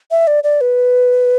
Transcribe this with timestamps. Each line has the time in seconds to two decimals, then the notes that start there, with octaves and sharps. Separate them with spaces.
0.11 E5
0.27 D5
0.44 D5
0.61 B4